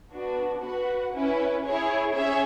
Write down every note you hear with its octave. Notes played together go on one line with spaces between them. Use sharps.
B3 D4 F#4
F#4 B4 F#5
C#4 E4 B4
E4 G#4 C#5
C#4 G#4 C#5 E5